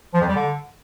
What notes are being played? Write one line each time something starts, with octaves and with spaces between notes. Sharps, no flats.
F3
F2
G3
D3